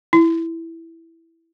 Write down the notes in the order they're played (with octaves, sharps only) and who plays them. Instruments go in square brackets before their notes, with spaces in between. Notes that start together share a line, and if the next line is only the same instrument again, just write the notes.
[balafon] E4